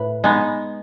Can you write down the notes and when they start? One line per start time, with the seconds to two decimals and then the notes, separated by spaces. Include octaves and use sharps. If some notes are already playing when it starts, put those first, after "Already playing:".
Already playing: A2 B4
0.24 G#3 B3 D#4